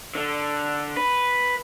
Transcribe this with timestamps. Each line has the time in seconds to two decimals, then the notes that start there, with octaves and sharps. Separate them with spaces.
0.15 D3
0.97 B4